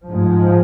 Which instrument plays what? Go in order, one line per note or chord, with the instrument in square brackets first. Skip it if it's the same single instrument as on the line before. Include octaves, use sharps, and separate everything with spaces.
[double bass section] G#2 F3 G#3